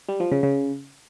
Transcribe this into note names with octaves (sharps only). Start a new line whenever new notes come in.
G3
F3
C#3
C#3